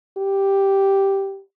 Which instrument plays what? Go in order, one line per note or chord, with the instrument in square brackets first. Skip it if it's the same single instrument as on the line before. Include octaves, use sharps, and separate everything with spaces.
[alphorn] G4